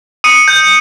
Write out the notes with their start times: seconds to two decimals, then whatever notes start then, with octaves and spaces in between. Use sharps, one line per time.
0.24 D#6 C#7 D#7
0.48 G6